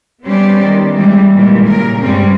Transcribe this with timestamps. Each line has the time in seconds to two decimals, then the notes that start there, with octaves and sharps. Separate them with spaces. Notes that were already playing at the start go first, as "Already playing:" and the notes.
0.24 G3 B3 C#4 G4 C5 D5
0.62 D#3
0.94 E3 G3 G#3
1.33 A#2 D#3 E3 G3 G#3
1.64 A#2 C#3 A#4
1.99 G2 C3 G3 G#3 C4 C#4